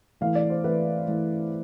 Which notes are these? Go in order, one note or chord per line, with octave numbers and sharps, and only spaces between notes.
E3 A3 E4 F5
D5
C5
E3 A3 E4 B4
E3 A3 E4